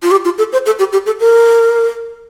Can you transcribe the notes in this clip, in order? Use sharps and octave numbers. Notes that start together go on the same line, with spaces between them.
F4
G4
F4
A4
C5
A4
G4
G4
A4
A#4